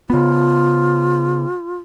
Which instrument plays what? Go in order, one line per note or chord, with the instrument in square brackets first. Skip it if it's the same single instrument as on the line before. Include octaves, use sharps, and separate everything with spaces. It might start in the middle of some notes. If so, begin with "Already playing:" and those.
[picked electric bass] C#3 B3 [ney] F4